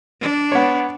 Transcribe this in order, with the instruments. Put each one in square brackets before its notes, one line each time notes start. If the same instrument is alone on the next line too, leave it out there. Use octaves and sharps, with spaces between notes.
[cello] D4
[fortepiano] B3 C#5